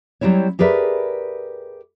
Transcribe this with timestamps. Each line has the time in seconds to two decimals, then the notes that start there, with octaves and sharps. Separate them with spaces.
0.21 F#3 G3 C4 E4 C#5
0.59 G4 G#4 A#4 B4 D5 E5